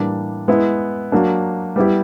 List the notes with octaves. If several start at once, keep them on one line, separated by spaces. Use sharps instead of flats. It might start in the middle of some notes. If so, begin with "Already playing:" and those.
Already playing: A2 E3 G3 A#3 D4
G#3 B3 E4
F#3 A#3 D4
G3 B3 E4 G4